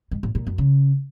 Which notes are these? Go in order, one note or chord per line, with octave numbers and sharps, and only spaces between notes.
G#2
A2
A#2
F#2
C#3